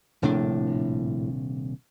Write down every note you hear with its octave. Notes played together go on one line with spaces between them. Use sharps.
D#1 A#1 A2 C3 D4